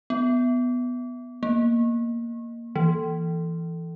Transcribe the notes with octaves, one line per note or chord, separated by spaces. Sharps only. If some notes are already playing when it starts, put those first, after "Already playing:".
B3
A#3
E3